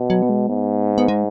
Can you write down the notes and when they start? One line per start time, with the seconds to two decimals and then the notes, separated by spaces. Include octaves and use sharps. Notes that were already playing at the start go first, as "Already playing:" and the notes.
Already playing: B2
0.10 F#3
0.22 B3
0.29 G#3
0.49 G#2 B3
0.98 B3
1.08 G#3